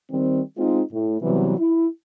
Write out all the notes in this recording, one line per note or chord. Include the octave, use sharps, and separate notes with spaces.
D#3 G3 C4
G#3 C4 D#4 F4
A2
C3 E3 F#3 G3 B3
E4